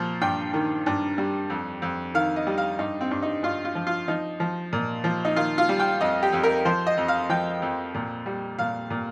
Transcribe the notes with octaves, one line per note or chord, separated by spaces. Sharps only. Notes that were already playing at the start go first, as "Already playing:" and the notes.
Already playing: A#2 F3
G2 G5
D#3
G2
G3
F2
F2
D#3 F5
D#5
G3
F5
G2 D#4
C4
G2
D#4
G2 F4
F4
F3
F4
F3 D#4
F3
A#2
F3
D#4
D#3 F4
F4
G3
G5
F2 D#5
G4
F2
A#4
F3 C5
D#5
F2
F5
F3 G5
F2
A#2
G3
A#2 F5
A#2